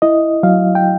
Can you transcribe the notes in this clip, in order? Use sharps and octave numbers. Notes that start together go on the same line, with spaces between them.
E4 D#5
F#3 F5
G5